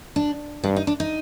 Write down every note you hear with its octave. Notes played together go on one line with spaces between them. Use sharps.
D4
G2 D4
D#4
D4
D#4